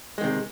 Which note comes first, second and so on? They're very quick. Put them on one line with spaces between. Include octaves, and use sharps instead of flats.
G#3 D#3 C3